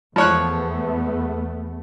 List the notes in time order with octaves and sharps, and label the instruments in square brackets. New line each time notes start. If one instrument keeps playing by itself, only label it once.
[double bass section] E2 A3 B3 [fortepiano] F3 C#5 F#6